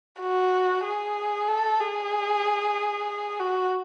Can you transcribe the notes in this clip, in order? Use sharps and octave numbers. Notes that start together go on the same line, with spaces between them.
F#4
G#4
A4
G#4
F#4